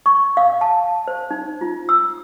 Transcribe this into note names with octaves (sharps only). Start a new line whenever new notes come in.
C#6
F5
A5
C5
D#4
F4
E6